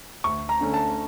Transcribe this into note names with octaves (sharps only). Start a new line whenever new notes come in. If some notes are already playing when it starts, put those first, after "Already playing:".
D2 C#6
A#5
D3 A3 C#4
A5